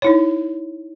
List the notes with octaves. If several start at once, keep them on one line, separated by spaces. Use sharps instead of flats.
D#4 E4 C#5